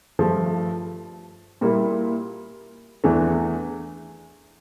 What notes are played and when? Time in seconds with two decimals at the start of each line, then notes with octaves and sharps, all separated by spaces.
0.19 G2 F3 A3
1.61 A#2 G3 A#3 E4
3.04 E2 E3 A3 D4